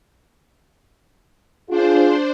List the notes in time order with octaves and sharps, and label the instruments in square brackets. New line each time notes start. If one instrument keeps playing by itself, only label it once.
[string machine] D4 C5 [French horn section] F4 G#4